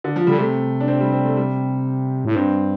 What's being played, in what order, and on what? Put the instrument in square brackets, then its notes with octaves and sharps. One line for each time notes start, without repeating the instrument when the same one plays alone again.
[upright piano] D3
F3
[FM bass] D3 [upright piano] G3
[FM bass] C3 [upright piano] A3
[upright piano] D4
C4
G3
C4
A3
G3
[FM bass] A2
[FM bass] G2 [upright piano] C4